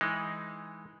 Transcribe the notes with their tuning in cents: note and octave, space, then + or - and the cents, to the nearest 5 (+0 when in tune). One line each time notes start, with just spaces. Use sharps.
E3 -5 G#3 +0 D#4 +0